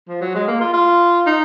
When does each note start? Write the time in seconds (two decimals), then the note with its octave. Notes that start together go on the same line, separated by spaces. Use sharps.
0.09 F3
0.21 F#3
0.35 G#3
0.47 A#3
0.61 F4
0.73 F4
1.26 D#4